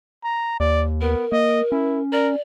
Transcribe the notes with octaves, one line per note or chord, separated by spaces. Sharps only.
A#5
D#2 D5
B3 A#4
A#3 D#5
C#4 E4
A#4 D5